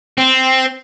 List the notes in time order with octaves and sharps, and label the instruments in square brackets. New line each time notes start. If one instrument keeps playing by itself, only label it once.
[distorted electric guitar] C4